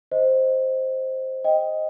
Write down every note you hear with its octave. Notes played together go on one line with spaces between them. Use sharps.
C5 D#5
D#5 G5